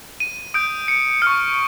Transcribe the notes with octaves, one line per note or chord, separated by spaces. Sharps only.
D#7
D#6 G6 D7
C#7
C#6 F6 C#7